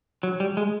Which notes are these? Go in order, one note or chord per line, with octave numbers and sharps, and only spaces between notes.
F#3
G3
G#3